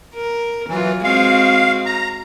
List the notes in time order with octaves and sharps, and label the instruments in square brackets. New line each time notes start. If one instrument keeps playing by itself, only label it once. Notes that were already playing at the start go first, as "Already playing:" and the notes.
[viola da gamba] A#4
[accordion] E3 [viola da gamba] F#3 F4
[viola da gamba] G#3 C4 F#4 [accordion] F5
[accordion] A#5